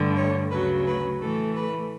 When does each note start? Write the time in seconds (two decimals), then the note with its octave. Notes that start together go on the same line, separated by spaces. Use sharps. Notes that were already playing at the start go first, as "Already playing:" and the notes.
Already playing: G2 D3 A3
0.16 C#5
0.50 D2 C#3 F#3 B4
0.86 B4
1.21 A2 E3 A3 A4
1.55 B4